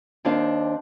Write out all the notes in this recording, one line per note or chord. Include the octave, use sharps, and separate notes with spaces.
D#2 C4 D4 C5 D#5 F5